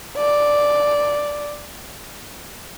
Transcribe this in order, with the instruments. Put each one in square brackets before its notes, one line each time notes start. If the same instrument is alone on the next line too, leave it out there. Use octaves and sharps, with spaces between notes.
[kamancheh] D5